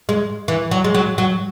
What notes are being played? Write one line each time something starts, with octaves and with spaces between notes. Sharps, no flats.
G#3
E3
F#3
G#3
F#3
F#3